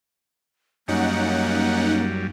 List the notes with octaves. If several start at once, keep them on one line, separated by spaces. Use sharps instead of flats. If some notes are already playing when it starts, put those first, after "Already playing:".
F#2 G3 A#3 C#4 D#4 F#5